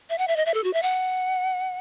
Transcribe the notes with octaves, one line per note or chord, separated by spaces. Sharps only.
E5
F#5
E5
D#5
E5
A4
F#4
E5
F#5